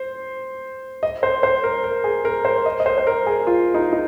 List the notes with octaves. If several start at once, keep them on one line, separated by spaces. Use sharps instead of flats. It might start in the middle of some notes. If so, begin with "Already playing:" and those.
Already playing: C5
D#5
C5
C5
A#4
A#4
G#4
A#4
C5
D#5
D#5
C5
C5
A#4
G#4
F4
D#4
D#4